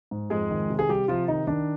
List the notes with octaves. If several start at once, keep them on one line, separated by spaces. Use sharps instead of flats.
G#2
F2 G#3 G#4
D#3
C3
G#4
C3 G3 G4
C3 F3 F4
D#3 D#4
D#3 D4